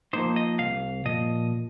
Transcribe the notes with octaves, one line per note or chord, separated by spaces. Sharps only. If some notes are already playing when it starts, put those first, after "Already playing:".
F3 A#3 D#4 C5
D#5
C2 F5
A#2 F3 D#5